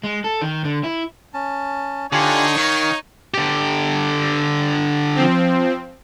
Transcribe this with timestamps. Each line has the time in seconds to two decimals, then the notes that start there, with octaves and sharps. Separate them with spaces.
0.03 G#3
0.24 A4
0.41 D#3
0.64 D3
0.84 E4
1.34 C#4 A5
2.12 D3 D#4 F4 G4 C#5 G#5
2.57 D#3 F5
3.34 D3 G4
5.15 F3 C4